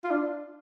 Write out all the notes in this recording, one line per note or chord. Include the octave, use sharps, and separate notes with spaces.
F4
D4